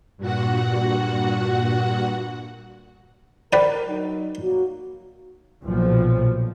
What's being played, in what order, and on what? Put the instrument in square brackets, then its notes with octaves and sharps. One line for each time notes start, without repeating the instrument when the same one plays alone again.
[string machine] G2 A#2 F#4 F#5
[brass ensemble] A#4 [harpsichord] B4 D5 G5
[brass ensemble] F#3 D#4
F#3 A#3 F#4
[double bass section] B1 A#2 F3